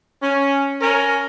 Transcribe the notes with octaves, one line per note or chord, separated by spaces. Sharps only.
C#4
C#4 A#4